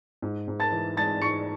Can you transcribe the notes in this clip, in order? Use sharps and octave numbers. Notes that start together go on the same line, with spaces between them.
G#2
G#2
A5 A6
E3
G#3 A5 A6
G#2 C#6 C#7